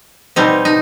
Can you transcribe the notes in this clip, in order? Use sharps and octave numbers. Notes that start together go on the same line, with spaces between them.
B2 G3 C4 D#4
D#4